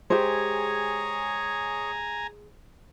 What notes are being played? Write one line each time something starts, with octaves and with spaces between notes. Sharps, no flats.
G#3 G4 G#4 C5 C#5 G#5 A#5